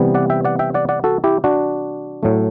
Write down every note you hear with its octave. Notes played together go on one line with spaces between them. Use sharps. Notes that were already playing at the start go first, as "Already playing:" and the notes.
Already playing: C3 E3 G3 B3
D5 F#5
E5 G5
D5 F#5
E5 G5
D5 F#5
D5 F#5
F#4 A4
E4 G4
D4 F#4
A2 F#3 A3